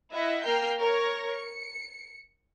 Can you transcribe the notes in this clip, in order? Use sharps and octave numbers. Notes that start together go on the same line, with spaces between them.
E4 D#5 E5 F#5
A#3 A#4 G5 F6 G6 C7
A#4 C#5 C#6 A#6
C#7